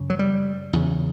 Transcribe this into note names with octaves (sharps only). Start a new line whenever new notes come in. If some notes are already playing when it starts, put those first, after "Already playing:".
Already playing: F#2 C#3
F#3
G3
E2 C#3